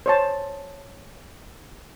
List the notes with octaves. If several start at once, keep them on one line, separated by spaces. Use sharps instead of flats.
C5 C#5 A5